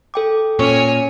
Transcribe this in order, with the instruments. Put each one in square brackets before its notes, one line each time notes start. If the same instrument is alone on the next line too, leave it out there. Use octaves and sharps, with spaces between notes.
[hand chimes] A4 G5 D6
[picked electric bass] A#2 [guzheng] C#4 [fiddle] C#5 G#5